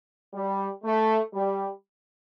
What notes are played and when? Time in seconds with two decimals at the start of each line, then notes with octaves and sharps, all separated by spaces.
0.34 G3
0.84 A3
1.33 G3